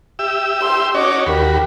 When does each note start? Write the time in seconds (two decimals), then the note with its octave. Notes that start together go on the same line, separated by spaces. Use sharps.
0.19 G4 E5 E6
0.62 C6
0.95 C#4 F#4 C#5 D#5 D6
1.27 D#2 F#4 G4 A#4 B5